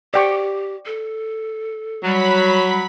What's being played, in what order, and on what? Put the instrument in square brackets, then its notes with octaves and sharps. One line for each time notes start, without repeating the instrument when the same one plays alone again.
[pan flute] G4 [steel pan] D5 G5 C#6
[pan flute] A4
[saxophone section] F#3 [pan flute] G3 [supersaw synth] B5 B6